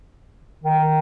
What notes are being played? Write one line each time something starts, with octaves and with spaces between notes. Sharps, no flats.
D#3